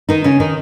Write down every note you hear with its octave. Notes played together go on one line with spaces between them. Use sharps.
D#3 D#4
C#3 C#4
D#3 D#4